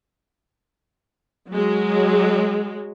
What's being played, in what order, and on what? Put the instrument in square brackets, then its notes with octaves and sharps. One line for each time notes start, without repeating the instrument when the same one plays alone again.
[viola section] F#3 G#3